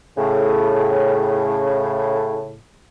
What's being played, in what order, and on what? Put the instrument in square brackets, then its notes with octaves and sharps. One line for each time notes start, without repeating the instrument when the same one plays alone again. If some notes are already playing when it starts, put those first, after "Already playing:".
[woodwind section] A2 C#3